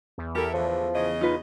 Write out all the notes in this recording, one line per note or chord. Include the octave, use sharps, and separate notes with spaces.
E2
E4 G4 A4 A#4
A2 D3 E3 F3
C#3 D#5
D#4 F4 B4